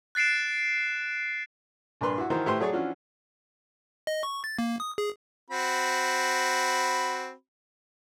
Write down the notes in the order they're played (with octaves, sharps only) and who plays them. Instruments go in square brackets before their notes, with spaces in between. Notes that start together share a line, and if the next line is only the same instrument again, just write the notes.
[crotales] F#6 A6 C7 D7 E7
[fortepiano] A#1 G2 A#4 B4 C6
E4 F#4
D#3 E3 F#4 A#4 C5
A2 E4 G4 B4 C5 C6
F#3 A3 G#4 C#5 D5
E3 F3 C#4 D4 F4 F#4
[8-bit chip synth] D#5
C#6
A6
A#3
D#6
G#4
[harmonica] C4 F#4 B5